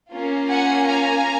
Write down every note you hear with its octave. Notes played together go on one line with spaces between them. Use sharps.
A#3 C#4 F4
F#5 G#5
G#5 A#5